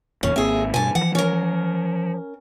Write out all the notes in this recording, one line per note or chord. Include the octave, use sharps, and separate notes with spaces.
F#1 E2 A#2 C#4
G#1 A#3 C4 G#4 E5
G2 B2 G#5 A5
E3 F3 F#5
C#4 A#4